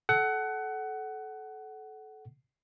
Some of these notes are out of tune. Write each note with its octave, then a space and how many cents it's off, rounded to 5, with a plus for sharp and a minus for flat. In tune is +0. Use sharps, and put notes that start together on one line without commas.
A4 -25 F#5 +20